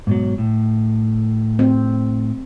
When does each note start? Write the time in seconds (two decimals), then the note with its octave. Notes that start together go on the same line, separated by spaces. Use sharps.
0.07 G#2 B2 F#3
0.38 A2
1.59 C4